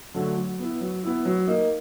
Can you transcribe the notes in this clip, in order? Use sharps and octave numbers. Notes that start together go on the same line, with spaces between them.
D3 F#3 A3 D4
F#3
B3 E4
F#3
B3 E4
F#3
A#3 D#4